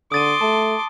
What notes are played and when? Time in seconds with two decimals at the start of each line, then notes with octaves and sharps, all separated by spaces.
0.12 D3 C6 D6 D#6 A6 D#7
0.41 A3 A5